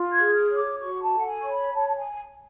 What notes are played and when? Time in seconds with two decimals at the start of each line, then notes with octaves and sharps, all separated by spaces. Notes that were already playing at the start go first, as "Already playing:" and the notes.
Already playing: F4
0.10 G#6
0.17 G#4
0.33 F6
0.49 C#5
0.56 D6
0.79 F#4 C#6
1.02 A5
1.11 A4
1.16 F#5
1.26 G#5
1.42 C#5 C#6
1.49 B5
1.72 C#5 A5
1.87 A5
1.96 G#5